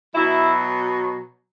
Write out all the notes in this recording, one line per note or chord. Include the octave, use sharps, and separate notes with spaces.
B2 F#3 E4